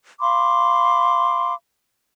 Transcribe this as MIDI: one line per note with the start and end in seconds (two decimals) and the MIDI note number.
0.21 1.53 77
0.21 1.53 83
0.21 1.53 84
0.21 1.53 86